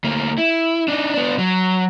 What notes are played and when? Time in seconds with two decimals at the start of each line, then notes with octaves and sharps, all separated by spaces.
0.04 D2 A#3
0.38 E4
0.88 D4 D#4
1.14 B3 D4
1.38 F#3